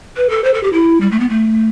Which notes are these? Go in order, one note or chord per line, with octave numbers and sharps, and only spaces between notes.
B4
A4
C5
A4
G4
E4
G3
A3
B3
A3